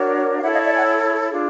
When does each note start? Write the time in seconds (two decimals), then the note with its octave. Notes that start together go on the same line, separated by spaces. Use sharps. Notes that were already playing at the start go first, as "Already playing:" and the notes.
Already playing: D4 F#4 A#4 C#5
0.38 F5
0.42 E4 A4 C#5 E5 F#5
0.53 D#5 F5
0.64 D5 E5
0.75 F#5 G#5
1.30 D4 F4 G#4